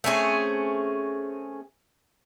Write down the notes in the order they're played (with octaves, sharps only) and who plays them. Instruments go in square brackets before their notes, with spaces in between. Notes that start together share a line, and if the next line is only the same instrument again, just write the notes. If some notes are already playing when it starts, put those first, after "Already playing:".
[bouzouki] A3 C4 C#4 G#4